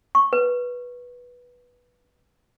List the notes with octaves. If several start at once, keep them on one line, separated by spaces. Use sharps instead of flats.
C#6
B4